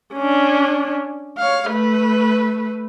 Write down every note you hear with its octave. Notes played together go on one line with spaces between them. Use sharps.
C#4 D4
C#5 F5
A3 B4